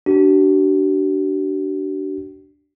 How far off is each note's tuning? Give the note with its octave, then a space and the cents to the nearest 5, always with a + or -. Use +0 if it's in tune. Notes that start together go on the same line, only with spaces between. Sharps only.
D4 +0 F#4 +45